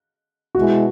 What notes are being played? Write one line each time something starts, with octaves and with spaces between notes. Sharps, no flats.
B2 G#3 E4 F#4